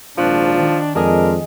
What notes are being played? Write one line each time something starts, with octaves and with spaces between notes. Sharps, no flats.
G#1 A#2 F3 D4 C#6 F#6
D#3
F2 G#3 D4 G#4 A#4 D#5 G#5